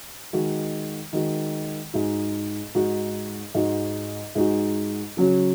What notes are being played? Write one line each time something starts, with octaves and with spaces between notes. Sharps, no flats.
D#3 G#3 F#4
D#3 G#3 F#4
G#2 G#3 D#4 F#4
G#2 G#3 D#4 F#4
G#2 G#3 D#4 F#4
G#2 G#3 D#4 F#4
C#3 F#3 C#4 F#4